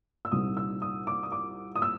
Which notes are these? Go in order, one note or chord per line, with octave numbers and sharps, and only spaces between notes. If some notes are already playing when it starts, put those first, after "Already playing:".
E6
C2 A#2 G3 C4 D#4 D#6
E6
D#6
D6
D#6
D6
D#6
E6